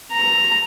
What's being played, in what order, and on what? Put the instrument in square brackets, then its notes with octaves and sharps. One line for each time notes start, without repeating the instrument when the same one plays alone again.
[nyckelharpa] A#5